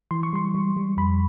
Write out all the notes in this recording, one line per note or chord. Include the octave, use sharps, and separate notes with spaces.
E3 C6
C#6
G3 C6
G3
G3
F2 B5